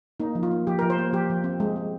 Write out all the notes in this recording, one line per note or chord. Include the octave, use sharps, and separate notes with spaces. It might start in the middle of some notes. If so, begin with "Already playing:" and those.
A#3 D#4
F3
F4
A#3
F3 G4
F3 A#4
C5
A#3
F3 G4
F3
C4
G#3
C4